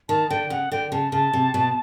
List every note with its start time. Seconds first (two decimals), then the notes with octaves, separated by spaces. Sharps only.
0.09 D#3 A5
0.30 D3 G5
0.50 C#3 F#5
0.72 D3 G5
0.92 C#3 A5
1.12 C#3 A5
1.33 C3
1.54 B2